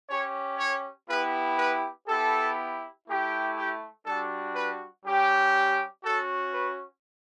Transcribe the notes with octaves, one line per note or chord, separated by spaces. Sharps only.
C#4 G4 C#5
C#5
B3 E4 G4 B4
B4
B3 E4 G4 A4
A3 E4 G4
G4
G3 D4 F#4 A4
B4
G3 C#4 G4
C#4 F#4 A4
B4